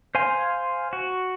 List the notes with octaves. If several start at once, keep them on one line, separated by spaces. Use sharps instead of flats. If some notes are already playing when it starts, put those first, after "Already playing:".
C5 F5 G#5 C6
F#4